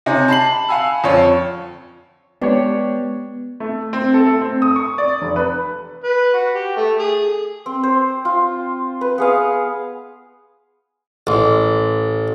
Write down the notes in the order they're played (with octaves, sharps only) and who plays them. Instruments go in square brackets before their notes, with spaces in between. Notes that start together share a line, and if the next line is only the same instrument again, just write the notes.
[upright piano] C3 D#4 C#5 G#5
A5 B5 C7 F#7
F5 F#5 G#5 B5 E6
F2 F4 C#5 F5
[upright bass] G#3 [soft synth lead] B3 [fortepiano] D4 G4 C#5
[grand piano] A3
C4
A4
A3
C4
D#6
C#6
D5
F1
B4
[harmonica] B4
F#4
G4
A3
G#4
[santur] C4
C5
F4
B4
B3 G#4 F5
[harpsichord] A1